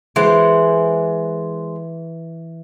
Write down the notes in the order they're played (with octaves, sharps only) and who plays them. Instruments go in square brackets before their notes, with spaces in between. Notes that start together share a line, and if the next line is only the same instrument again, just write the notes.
[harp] E3 [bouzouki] G#3 C5 F#5